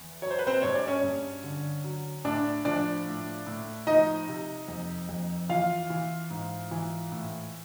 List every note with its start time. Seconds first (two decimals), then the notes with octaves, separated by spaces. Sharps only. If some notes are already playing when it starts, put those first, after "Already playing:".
Already playing: E2
0.22 F#3 C#5
0.30 C5
0.39 B4
0.47 C4 C5
0.62 G2 C#5
0.75 D5
0.88 C#4 C#5
1.03 G2
1.44 D3
1.84 F#3
2.25 A2 D4 D5
2.65 F3 D4 D5
3.06 A2
3.47 A2
3.87 F3 D#4 D#5
4.28 C3
4.68 F2
5.09 F2
5.49 E3 F4 F5
5.90 E3
6.30 G#2
6.71 E3
7.12 A2